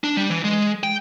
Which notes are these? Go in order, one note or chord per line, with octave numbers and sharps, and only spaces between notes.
D4
G3
E3
G#3
G5